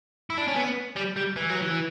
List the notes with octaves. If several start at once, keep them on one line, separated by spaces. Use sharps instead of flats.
E4
D4
C#4
B3
G3
G3
E3
F#3
E3